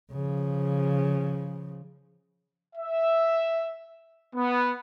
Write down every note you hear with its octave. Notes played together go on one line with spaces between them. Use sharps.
C#3 F3
E5
B3